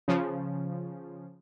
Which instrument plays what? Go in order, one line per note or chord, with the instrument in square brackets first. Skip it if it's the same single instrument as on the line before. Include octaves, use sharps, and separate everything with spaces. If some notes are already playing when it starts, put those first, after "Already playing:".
[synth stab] C#3 F3